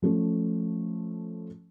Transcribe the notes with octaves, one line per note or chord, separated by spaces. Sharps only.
F3 A3 C#4